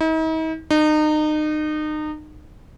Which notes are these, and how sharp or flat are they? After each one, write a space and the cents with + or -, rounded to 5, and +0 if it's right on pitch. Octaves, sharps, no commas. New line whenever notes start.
D#4 +45
D#4 -30